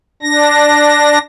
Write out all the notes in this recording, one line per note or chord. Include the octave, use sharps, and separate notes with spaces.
D4 A#6